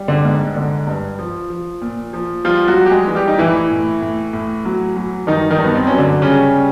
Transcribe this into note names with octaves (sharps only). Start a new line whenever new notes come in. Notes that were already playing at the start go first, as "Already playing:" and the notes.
Already playing: G3
D3 D4
G#2
D3
G2
F3
F3
A#2
F3
F3 G3 F4
F#3 F#4
G3
G4
G#3 G#4
E3
G3 G4
D#4
A2 E3 E4
A2
A2
A2
F#3
F#3
G2 D#3 D#4
D#3 D#4
G2
B3
C4
F#3 C#4
D3 D4
C#3 G3 C#4
G3